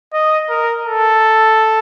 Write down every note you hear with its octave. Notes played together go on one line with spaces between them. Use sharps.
D#5
A#4
A4